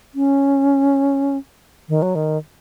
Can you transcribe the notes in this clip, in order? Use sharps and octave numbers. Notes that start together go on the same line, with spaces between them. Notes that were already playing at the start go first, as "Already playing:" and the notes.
C#4
D#3
F#3
D#3